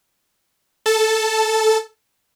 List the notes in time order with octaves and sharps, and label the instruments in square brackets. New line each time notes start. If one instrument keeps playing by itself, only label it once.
[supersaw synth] A4 A5